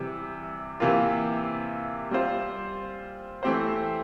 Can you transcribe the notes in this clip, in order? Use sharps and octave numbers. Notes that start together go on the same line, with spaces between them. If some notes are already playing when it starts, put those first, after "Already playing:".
Already playing: C3 E3 G3
C3 E3 A#3 F4
G3 C4 F4 C5
E3 A3 C4 G4 C5